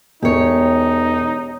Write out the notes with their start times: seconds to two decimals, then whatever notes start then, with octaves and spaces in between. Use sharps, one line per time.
0.22 E1 D#4 G4 C#5